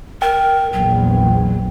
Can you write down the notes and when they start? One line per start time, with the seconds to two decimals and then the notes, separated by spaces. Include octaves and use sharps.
0.22 A#4 G5
0.73 A#1 E2 F#3